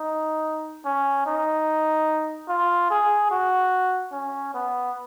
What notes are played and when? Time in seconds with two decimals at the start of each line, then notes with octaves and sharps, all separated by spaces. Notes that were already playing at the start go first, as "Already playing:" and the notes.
Already playing: D#4
0.85 C#4
1.26 D#4
2.49 F4
2.90 G#4
3.31 F#4
4.12 C#4
4.54 B3